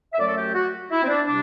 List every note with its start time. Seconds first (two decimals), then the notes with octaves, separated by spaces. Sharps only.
0.13 E5
0.18 F#2 F#3 A3 D5
0.27 A4
0.36 G4
0.54 F#4
0.90 E4
1.03 C4
1.07 D4
1.26 C3 G3 D4